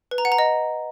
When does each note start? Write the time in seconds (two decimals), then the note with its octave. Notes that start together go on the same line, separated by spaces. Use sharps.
0.11 B4
0.18 A#5
0.25 F#5
0.32 A#5
0.39 D#5